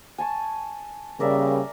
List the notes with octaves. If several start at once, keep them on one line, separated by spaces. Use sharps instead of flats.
G#5 A5 C#6
C#3 G3 A#3 C#4 A#4 D5 E5